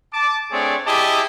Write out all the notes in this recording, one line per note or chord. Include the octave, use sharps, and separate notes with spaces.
A5 D6
A3 C4 D4 G#4 C#5 D5
E4 G4 G#4 D#5 A5 D6